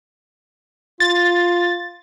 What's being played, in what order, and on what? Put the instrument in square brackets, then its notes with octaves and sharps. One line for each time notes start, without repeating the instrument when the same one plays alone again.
[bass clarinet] F4 [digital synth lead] A6